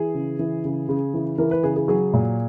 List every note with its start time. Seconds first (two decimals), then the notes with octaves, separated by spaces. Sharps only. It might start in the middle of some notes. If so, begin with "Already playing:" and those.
Already playing: E3 G#4
0.14 C#3
0.39 E3
0.64 C#3
0.89 C#3
1.14 E3
1.38 E3 A#4
1.51 B4
1.63 C#3 G#4
1.76 G#4
1.88 F#3 G#4
2.14 A#2